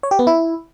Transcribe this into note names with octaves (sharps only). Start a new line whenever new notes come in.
C#5
G4
B3
E4